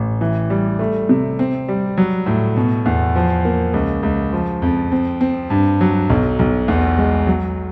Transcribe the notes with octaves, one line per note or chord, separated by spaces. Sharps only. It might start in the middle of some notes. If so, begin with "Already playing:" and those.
Already playing: A1
E3
G3
A3
C3
C4
G3
F#3
A2
B2
E2
F3
A#3
C#2
C#2
F3
F2
C4
C4
G2
F#3
B1
B1
E2
G#3
F#3